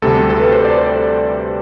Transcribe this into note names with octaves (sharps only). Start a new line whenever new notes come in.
D2 C3 G3 A4
A4
B4
C5
D5
C5